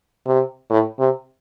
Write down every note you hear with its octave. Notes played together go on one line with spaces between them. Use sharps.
C3
A2
C3